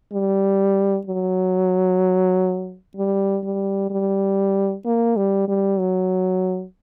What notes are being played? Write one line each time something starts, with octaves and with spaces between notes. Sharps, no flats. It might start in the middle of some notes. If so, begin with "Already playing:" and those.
G3
F#3
G3
G3
G3
A#3
G3
G3
F#3